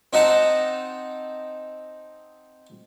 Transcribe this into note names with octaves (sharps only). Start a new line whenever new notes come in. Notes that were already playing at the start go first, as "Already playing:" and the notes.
C4 D#4 D#5 F#5 A5 A#5